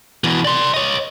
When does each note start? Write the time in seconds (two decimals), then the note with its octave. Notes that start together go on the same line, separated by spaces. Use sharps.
0.24 B2 E3
0.45 D5 C6
0.74 C#5 D#5